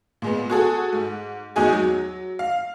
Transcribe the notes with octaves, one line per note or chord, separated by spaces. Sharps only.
A#2 G#3 B3
F#4 G#4 A4
G#2
E2 D#4 F#4 G#4 G#5
F#3
F5